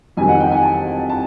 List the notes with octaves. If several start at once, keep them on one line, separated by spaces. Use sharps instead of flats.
F2 C3 D#3 F#3 G#5
F#5
G5
G#5
A5
A5